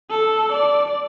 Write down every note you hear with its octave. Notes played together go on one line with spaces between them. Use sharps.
A4
D5